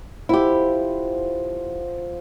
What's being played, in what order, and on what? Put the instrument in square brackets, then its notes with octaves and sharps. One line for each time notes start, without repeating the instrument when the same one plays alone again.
[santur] F3 F#5 C6 [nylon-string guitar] E4 G4